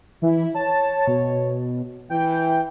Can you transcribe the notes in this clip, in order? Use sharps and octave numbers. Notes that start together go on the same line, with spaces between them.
E3 E4
C#5 A5
B2
E3 G5